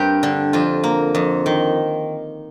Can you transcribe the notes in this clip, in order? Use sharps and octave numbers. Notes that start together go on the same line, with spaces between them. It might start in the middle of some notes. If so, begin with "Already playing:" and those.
Already playing: G2 G3 C4 G4 A#4
D3
F2 F4
A#3
F2
D#3